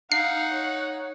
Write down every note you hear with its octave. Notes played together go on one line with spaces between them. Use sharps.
D#4 F5 F#5 C7
C#5